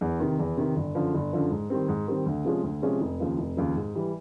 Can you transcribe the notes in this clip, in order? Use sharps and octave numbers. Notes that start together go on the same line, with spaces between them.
E2
C3 D#3
E2
C3 D#3
G1
F#2 D3 F3
G1
F#2 D3 F3
G#2
D#3 G3 C4
G#2
D#3 G3 C4
D2
C3 F3 G#3 C#4
D2
C3 F3 G#3 C#4
F1
D#2 C#3 F3
F1
D#2 C#3 F3
G#2
E3 G3